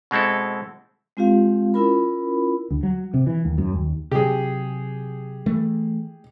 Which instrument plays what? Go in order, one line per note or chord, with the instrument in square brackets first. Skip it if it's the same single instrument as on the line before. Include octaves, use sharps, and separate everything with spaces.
[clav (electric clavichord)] B2 G#3 C4 E4 A4
[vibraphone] G#3 C4 F4 G4 F5
C#4 E4 F4 A#4 B5
[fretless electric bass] D2
F#3
C3
E3
D#2
F#2
D#2
[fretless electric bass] C3 F#3 [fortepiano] G4 G#4
[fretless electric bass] E3 A3